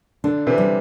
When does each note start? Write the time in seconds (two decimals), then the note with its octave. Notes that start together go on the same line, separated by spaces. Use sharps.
0.24 D3 D4
0.47 C3 E3
0.58 G3